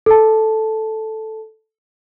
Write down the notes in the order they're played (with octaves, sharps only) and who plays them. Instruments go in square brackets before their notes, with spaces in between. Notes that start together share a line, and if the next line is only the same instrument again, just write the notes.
[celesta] A4 A5